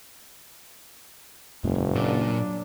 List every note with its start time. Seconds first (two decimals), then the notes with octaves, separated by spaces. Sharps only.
1.64 F#1 E2 A#2 G#3
1.95 A#2 F#3 D4